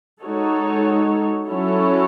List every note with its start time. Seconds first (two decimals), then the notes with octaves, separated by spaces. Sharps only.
0.22 G#3 D#4 F#4 A4 C#5
1.46 F#3 C#4 E4 A4 C#5